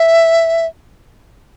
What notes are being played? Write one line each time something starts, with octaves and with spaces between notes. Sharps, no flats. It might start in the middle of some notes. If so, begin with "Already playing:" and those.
Already playing: E5